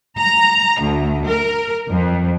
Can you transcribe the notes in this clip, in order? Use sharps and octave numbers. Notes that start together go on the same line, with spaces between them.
A#5
D2
A#4
F2